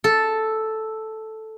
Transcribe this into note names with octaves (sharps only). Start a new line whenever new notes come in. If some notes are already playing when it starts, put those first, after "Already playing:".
A4